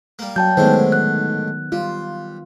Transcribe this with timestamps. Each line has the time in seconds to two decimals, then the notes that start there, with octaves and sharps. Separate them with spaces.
0.19 G3 A#3
0.36 F#3 G5 A5 G6
0.57 A2 D3 D#3 G#3 B3 C5
0.92 F#6
1.72 G3 F4